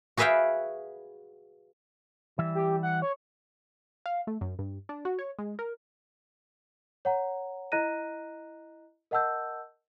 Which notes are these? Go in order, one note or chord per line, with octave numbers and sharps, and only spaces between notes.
F#4 G#4 B4 E5 F5 G5
E3 G3 E5
G4
F#5
C#5
F5
A3
F#2
G2
D4
F#4
C#5
G#3
A#4
C#5 F#5 A#5
E4 D#5 A#5 F#6 A#6 D#7
A#4 D#5 F#5 A5 E6 G6